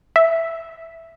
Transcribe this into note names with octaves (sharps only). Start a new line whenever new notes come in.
E5